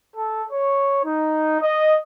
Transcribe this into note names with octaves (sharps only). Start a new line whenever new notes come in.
A4
C#5
D#4
D#5